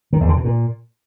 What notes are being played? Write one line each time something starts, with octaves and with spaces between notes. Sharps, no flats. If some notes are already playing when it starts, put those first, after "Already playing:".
D#3
E2
D3
B2
A#2